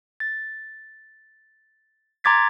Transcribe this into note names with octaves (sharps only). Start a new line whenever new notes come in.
A6
A#5 C6 D6 G#6 A6 B6